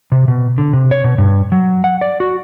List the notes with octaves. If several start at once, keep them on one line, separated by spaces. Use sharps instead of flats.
C3
B2
D3
C3
C#5
B2
G2
F#3
F#5
D5
F#4